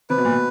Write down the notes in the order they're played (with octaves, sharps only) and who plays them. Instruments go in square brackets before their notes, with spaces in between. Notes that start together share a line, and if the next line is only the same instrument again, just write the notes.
[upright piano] C3 [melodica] B4
[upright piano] B2
A#2
B2